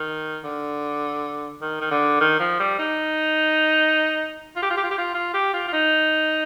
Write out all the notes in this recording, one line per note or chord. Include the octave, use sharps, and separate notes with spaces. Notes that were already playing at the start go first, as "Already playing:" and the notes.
Already playing: D#3
D3
D#3
D#3
D3
D#3
F3
G3
D#4
F4
G4
F4
G4
F4
G4
F4
F4
G4
F4
F4
D#4